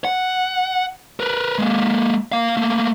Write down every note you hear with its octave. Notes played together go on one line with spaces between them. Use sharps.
F#5
A#4 B4
G#3 A#3
A#3 F5
A3 A#3